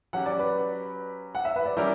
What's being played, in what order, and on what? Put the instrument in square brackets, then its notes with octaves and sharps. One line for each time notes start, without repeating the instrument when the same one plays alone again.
[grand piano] F#3 C#4 G4 [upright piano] F#5
[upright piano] D5
B4
F#5
E5
B4
D5
[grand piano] G3 C#4 E4 G4 A#4 [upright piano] D5